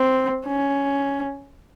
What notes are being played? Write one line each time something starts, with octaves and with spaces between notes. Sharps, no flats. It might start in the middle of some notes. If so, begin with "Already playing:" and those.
Already playing: C4
C#4